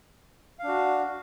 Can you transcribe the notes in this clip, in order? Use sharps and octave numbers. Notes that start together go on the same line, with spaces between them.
D4 F#4 F5